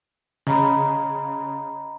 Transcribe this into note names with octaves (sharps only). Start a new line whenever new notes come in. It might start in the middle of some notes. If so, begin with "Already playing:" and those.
C#3 D#5 A#5 B5